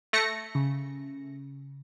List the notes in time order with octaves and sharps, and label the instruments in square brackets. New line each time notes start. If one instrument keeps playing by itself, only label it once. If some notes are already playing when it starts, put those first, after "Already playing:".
[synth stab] A3 A#6 C#7
[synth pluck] C#3